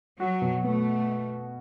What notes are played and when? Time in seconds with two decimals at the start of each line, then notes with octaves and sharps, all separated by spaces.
0.20 F#3 F#4
0.42 B2
0.63 A3 B3